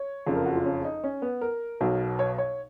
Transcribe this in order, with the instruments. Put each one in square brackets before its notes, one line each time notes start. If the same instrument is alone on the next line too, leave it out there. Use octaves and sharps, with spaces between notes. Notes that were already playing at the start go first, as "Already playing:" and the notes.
Already playing: [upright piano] C#5
F#1 F2 C#3 F3
A#4
F#4
F4
C#4
D#4
C#4
B3
A#4
B1 B2 F#3
C#5
C#5